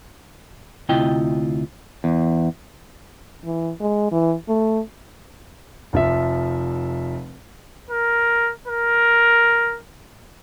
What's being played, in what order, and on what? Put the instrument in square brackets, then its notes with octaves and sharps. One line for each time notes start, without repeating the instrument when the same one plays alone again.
[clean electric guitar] D2 C3 E4 F4 D#5 G5
E2
[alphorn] E3
G#3
E3
A3
[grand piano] F1 F3 E5
[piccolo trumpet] A#4
A#4